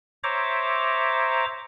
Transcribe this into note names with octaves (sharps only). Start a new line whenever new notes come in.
C5 C#5 E5 A#5 D6